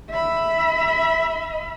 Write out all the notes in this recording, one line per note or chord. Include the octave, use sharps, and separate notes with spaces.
E5 B5